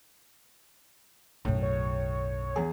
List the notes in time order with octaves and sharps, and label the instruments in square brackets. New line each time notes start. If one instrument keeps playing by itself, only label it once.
[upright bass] B1 F#2 [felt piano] A2
[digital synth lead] C#5
[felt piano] E2 G#4